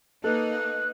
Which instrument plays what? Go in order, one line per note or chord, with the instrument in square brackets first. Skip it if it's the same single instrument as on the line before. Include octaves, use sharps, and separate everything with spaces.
[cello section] A#3 D#4 [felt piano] A4 [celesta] B4 D#5 [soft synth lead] F#6